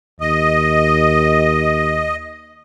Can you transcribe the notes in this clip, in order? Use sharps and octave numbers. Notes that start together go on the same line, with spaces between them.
D#2 D#5